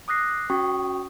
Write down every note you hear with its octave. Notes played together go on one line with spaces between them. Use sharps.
D6 D#6 F#6 A#6 C7
C#4 F#4 G5 C#6 D#6